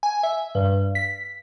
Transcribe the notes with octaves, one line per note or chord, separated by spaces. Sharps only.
G#5
E5
G2
B6